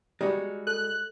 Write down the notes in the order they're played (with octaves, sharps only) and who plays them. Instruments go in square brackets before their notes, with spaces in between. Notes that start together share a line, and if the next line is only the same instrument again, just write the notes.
[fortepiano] G3 [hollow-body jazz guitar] G#3 D#4 F#4
[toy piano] A4 [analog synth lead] F#6